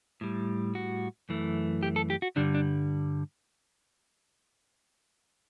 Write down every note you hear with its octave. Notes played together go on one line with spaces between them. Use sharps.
A2 G3
F#4
F#2 E3 A3
G4
A4
G4
F#4
G2 D3 G3 D4
D4